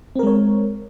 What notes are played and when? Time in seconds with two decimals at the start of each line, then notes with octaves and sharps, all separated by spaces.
0.16 C4
0.19 A#4
0.23 G#3
0.27 C#5